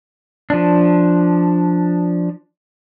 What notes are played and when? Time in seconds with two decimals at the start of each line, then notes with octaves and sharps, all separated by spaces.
0.50 F3 D4